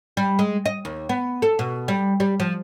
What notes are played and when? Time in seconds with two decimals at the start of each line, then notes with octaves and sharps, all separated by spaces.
0.17 G3
0.39 G#3
0.66 D#5
0.85 D#2
1.09 B3
1.42 A4
1.59 B2
1.88 G3
2.20 G3
2.40 F3